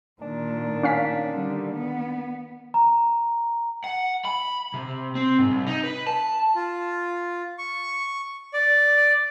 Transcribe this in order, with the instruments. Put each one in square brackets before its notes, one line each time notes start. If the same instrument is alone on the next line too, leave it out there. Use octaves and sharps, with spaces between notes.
[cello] A#2 [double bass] D#3 [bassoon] D4
[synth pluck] C#4 F5 B6
[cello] D3 G3
B3
[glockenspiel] A#5
[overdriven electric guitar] F#5
B5
C3
C4
G#2
C2
D#4
B4
A5
[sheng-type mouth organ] F4
C#6
D5